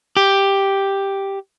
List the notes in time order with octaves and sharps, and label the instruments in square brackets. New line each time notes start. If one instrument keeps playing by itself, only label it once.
[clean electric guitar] G4